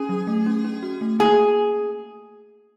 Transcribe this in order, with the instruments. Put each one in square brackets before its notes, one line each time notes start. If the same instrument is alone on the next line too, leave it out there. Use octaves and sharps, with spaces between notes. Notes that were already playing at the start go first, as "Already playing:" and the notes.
Already playing: [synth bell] C#4 [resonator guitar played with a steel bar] G#4
[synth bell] F#3
A3
C#4
C#4
F#4
A3
[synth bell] A#3 [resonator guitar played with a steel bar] G#4